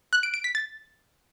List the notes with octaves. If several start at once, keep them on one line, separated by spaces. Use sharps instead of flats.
F#6
D7
D7
B6
A6